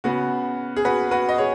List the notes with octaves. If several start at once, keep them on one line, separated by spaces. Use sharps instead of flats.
C#3 B3 F#4
G#4
F#4 B4
F#4 B4
D#5
G#4 C#5